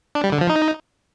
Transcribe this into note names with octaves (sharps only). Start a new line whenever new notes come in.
D4
G3
D3
F3
D#4